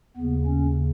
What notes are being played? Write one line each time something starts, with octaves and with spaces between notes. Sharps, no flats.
D#2 C#3 B3
C#4